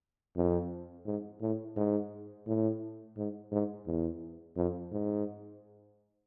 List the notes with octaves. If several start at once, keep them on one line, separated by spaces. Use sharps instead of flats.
F2
G#2
A2
G#2
A2
G#2
G#2
E2
F2
G#2